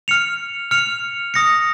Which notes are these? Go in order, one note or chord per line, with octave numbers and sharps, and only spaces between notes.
F6 C#7 F7
F6 C#7 F7
D#6 A#6 C#7